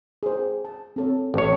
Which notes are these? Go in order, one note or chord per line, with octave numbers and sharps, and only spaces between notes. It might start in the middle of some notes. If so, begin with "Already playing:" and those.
G#4 C5
A5
C4 A4 C#5
A1 A4 C#5